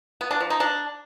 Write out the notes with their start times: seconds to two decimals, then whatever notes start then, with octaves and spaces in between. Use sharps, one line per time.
0.21 B3
0.31 D4
0.40 F3
0.50 D#4
0.60 D4